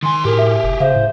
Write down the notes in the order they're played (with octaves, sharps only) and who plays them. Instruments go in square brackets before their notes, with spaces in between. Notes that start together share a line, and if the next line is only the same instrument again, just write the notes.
[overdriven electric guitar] D#3 G#5 [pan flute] C6
[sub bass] A2 [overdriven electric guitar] G4 G#4 [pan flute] A#4
[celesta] E5
[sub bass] F1
[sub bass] C#3 [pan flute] C5 [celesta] E5 F5
[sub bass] A2